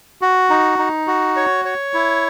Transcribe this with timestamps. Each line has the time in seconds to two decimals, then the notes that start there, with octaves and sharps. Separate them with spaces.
0.22 F#4
0.50 D#4
0.79 D#4
1.07 F#4
1.36 C#5
1.65 C#5
1.94 E4